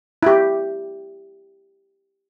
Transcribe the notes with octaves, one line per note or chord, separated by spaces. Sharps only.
E4 G4